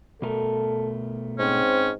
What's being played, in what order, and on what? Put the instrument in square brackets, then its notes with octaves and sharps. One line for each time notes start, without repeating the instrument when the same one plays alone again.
[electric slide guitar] B2 A3 A#4 [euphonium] A4
[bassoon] G#2 [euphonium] C4 [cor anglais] C#4